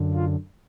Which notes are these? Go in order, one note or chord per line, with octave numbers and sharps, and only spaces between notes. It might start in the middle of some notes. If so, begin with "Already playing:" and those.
Already playing: F#2 D3
F4